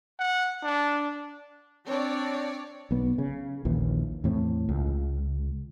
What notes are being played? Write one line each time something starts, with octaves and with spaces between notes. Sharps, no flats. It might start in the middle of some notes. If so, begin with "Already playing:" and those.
F#5
D4
C4 D4 C#5 D5
B1 B3
C#3
A#1 D#2 E3
E2 A2 C4
C#2